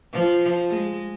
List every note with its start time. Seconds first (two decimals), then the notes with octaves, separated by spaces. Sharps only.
0.13 F3
0.69 G#3